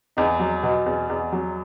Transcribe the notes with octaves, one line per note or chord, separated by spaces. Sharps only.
E2 D#4
F#3
B2
E2
E2
F#3